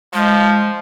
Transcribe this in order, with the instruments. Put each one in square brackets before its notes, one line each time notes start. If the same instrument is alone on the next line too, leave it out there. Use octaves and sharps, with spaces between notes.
[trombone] F3 [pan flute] G#3